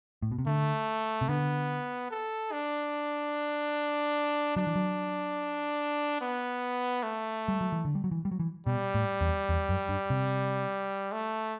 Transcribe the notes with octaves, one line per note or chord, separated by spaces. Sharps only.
A2
B2
C3
D3 A3
C3
D3 B3
A4
D4
F#3 D4
E3
F#3
B3
A3
G3
F#3
E3
D3
G3
F#3
E3
G3
F#3
E3
B2 G3
A2
E2
E2
F#2
G2
C3
A3